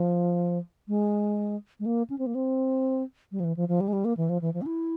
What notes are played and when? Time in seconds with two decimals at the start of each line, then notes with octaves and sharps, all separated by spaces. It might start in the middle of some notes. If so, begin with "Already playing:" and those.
Already playing: F3
0.88 G#3
1.80 G#3
1.86 A#3
2.10 C#4
2.19 C4
2.26 A#3
2.35 C4
3.32 G3
3.40 F3
3.44 E3
3.57 F3
3.68 F3
3.81 G3
3.88 G#3
3.93 G3
4.05 A#3
4.17 E3
4.29 F3
4.42 E3
4.54 F3
4.62 C#4
4.66 E4